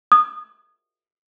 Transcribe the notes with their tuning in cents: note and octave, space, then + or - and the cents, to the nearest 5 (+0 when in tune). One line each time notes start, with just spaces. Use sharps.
D#6 -20